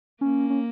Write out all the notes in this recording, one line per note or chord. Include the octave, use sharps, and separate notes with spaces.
A#3 C#4
C#4